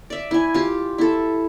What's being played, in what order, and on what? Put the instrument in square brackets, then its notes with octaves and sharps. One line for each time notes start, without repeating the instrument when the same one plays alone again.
[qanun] D5 E5
E4 G#5
F4 G4
E4 A4